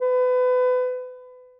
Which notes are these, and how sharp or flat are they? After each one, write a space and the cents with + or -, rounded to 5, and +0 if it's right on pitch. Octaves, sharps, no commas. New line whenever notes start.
B4 +30